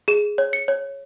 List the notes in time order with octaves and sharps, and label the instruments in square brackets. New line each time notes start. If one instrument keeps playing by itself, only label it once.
[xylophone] G#4 E7
C#5
C#7
C#5